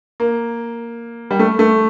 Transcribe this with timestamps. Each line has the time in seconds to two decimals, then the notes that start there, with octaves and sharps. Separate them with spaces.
0.20 A#3
1.31 G3
1.39 A3
1.59 A3